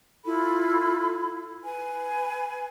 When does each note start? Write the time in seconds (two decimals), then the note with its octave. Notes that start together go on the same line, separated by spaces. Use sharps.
0.25 E4 F4 A4 B5
1.63 B4 G#5